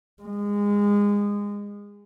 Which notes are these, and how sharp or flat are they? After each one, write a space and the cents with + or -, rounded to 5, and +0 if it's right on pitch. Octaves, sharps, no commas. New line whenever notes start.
G#3 -25